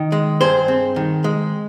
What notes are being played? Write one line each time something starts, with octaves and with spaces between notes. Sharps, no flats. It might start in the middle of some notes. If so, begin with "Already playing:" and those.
Already playing: D#3
G#3
G2 G#4 C5
C4
D#3
G#3